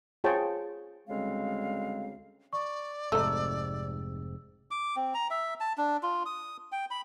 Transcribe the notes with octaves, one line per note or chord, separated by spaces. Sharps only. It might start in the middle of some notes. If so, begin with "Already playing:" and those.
F4 G#4 C5 C#5 G5 A5
D2 C#3 G3 G#3 C4 F5
D5 C#6
F1 G#2 C3 A3 D#4 E6
D6
C4
A#5
E5
A5
D4
F4
D#6
G5
B5